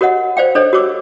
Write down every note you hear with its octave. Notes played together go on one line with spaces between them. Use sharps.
F#4 A#4 C#5 D#5 F#5
C5 D5 F5 G5
D4 A4 C5 C#5 D#5
F#4 A#4 C#5 D6 E6